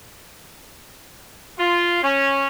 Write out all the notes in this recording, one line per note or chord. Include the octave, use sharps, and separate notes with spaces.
F4
C#4